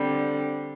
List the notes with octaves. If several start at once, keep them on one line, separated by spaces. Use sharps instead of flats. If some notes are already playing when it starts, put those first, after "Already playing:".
Already playing: D3 G3 C4